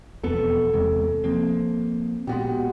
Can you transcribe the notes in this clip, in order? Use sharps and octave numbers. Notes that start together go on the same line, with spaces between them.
E1 F2 B3 A4
E2 C3 G#3
F3 A#3 C4
A#2 G#3 B3 F#4 G4